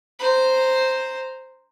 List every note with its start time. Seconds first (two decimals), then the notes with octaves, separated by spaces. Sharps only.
0.19 C5 A#5